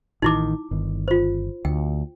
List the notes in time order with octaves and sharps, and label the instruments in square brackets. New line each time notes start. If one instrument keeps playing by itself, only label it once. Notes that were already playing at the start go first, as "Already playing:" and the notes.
[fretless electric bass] A1 D#3 [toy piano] D#4 E4 D6
[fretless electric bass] G1 D#3
[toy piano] F4 C5
[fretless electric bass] D2 [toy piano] G5